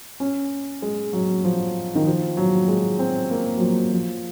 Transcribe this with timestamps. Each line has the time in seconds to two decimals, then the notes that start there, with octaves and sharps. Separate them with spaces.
0.20 C#4
0.82 G#3
1.13 F#3
1.44 F3
1.95 D#3
2.07 F3
2.37 F#3
2.68 G#3
2.99 C4
3.30 A#3
3.56 F#3
3.61 F3
3.92 F3